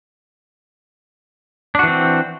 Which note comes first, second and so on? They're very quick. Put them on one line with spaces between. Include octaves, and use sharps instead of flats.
D4 F#4 E3 C4